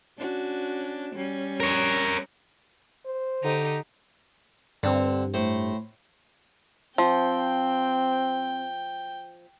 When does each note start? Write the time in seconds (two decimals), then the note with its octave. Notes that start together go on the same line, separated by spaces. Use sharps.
0.18 C#4 D4 F#4
1.15 G3 C#4
1.60 A#4 C#5
3.06 C5
3.44 D3 D#4 G4
4.83 G2 D3 C4
5.34 A2 C5
6.98 F3 C4 G5